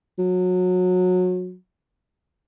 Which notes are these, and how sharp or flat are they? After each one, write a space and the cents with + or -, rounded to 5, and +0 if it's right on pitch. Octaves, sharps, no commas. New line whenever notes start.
F#3 -25